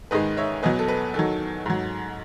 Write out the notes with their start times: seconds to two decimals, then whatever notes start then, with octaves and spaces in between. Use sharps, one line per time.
0.11 G#2 D#3 G#3 B4 D#5
0.37 C#5 E5
0.63 E2 B2 F#3 B4 D#5
0.79 A4
0.88 B4
1.14 E2 D#3 F#3 A4
1.66 G#2 F#3